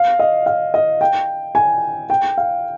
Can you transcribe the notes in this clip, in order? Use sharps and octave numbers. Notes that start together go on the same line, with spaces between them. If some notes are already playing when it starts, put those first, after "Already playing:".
Already playing: F5
D#5
F5
D#5
G5
G#5
G5
F5